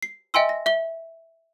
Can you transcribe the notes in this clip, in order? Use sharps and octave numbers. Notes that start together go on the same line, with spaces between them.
C7
D#5 E5 G5 G#5 C6 E6
A#6
E5 G7